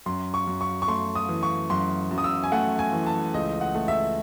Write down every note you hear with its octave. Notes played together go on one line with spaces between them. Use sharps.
F#2 C6
C#6
F#2
C#6
C#6
A3 C6
D#6
E3
C#6
F#2 C6
F#2
D#6
E6
G#5
A3 F#5
G#5
E3
A5
C#2 D#5
F#5
A3
E5